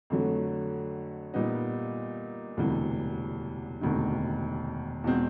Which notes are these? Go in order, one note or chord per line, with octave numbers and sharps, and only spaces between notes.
F2 D3 F#3 A3
A#2 G3 B3 D#4
E1 D2 C3 E3 G3
E1 D2 C3 D#3
E2 B2 G#3 C4